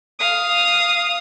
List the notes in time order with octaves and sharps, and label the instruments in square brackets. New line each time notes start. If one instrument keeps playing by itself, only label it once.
[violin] F5 D#6